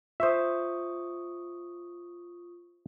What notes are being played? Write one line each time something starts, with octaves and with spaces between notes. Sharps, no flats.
F4 C5 E5 C#6 D#6